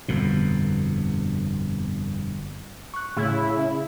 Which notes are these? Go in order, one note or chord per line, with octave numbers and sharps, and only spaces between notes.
G1 F2 B2
C#6 F#6
A2 C#3 E4